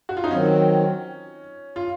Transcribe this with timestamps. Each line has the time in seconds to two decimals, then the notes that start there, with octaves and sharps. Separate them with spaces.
0.09 F#4
0.17 F4
0.24 D#4
0.31 D#3 F#3 C4 C#4
1.76 F4